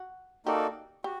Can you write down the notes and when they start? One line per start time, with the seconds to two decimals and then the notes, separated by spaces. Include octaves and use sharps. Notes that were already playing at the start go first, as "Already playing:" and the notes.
Already playing: F#4
0.46 A#3 D#4 F#4 G4 A4 D5
1.04 F#4 G4